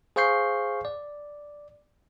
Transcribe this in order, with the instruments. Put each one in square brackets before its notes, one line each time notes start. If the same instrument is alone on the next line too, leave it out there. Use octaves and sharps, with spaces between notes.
[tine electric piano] G#4 C5 F5 C#6 G6 C7
D5